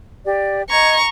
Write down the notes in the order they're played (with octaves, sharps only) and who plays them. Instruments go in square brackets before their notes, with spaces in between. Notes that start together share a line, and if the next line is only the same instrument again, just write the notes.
[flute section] G4 D5
[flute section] D#5 G#6 [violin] A#5 C#6